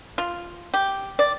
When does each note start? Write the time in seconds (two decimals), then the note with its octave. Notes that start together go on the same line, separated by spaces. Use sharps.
0.18 F4
0.74 G4
1.19 D5